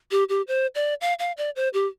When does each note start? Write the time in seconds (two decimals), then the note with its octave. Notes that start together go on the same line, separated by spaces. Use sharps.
0.11 G4
0.29 G4
0.48 C5
0.75 D5
1.01 F5
1.19 F5
1.37 D5
1.56 C5
1.74 G4